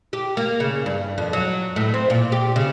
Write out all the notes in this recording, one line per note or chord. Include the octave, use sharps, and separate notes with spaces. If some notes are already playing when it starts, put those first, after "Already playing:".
G4
A#3
C#3
G2
F2
F#3
A2
C4
A#2
G4
C#3